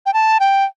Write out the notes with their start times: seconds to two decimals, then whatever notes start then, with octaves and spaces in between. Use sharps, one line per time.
0.06 G5
0.14 A5
0.40 G5